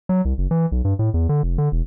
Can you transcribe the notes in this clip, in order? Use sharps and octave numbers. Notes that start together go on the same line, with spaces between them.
F#3
C2
F#1
E3
B1
G2
A2
E2
D3
F1
D3
E1